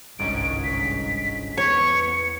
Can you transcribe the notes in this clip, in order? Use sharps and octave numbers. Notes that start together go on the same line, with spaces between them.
G1 C2 G#2 D#3 C#4 D7
B6
E2 B3 C#5 C#7